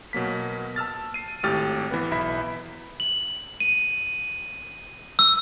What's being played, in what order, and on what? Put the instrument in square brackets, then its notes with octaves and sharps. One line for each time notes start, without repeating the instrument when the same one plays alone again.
[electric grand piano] B2 F#3 A#3 B6
A5 E6 F6 A6
C7 D#7
G#1 A2 G4 F6 A6
E3 B3 B4
B1 E4 E5 B5 B6
[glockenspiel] F#7
D#7
E6